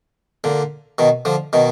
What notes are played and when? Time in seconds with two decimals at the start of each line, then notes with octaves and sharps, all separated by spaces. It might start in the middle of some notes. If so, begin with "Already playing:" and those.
0.44 A#2 D3
0.98 B2 D#3
1.25 D3 F3
1.53 B2 D#3